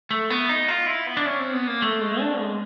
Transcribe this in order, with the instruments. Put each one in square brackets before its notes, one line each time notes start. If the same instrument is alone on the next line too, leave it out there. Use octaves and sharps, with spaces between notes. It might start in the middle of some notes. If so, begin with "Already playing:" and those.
[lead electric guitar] A3
B3
D#4
F4
E4
B3
D4
C#4
C4
B3
A#3
A3
G#3
D4
G#3